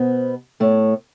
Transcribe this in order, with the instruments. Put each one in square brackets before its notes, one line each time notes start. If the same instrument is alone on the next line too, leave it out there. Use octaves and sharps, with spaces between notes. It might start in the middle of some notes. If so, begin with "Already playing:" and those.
Already playing: [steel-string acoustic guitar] B2 B3 [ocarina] C5
[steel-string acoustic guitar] A2 A3 [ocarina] C#5